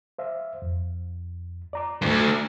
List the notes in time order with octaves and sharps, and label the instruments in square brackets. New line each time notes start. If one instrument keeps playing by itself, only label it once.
[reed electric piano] C5 E5 F5
F2
D5 A#5 D6
[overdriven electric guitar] D2 G2